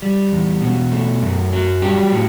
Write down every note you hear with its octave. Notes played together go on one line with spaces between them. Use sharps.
G3
E2
B2
A3
F#2
F#3
G3 G4
A2